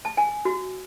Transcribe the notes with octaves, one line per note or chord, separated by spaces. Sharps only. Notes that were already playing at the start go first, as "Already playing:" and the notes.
A5
G#5
F#4